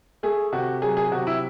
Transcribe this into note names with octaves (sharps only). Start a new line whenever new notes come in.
A3 G#4
C3 F#4
F#3 G#4
G#4
C3 F#4
E4